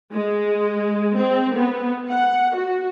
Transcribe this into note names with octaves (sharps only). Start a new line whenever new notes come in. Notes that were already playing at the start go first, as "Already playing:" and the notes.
G#3
C4
B3
F#5
F#4